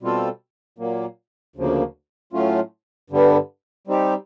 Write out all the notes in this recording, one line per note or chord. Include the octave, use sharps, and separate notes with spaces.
B2 G3 C4 F4 A4
A#2 F#3 A#3
D2 C#3 F3 A#3
A2 F#3 A3 C#4 F4
G2 D3 G3 B3
G3 C4 D#4 G4